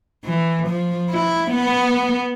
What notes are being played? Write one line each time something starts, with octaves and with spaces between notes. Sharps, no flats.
E3
F3
E4
B3